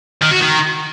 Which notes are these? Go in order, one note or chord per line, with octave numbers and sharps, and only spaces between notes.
D#3
F#4
D#3